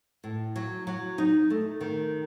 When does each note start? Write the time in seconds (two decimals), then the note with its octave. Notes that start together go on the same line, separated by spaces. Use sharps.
0.24 A2
0.56 F#3
0.87 F#3
1.18 D#4
1.50 A3
1.81 D#3